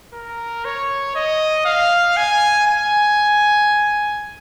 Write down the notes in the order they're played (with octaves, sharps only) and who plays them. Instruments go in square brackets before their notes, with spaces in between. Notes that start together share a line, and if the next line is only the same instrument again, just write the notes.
[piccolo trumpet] A#4
C#5
D#5
F5
G#5
G#5